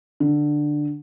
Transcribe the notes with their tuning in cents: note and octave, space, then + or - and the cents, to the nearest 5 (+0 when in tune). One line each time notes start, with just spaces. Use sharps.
D3 +10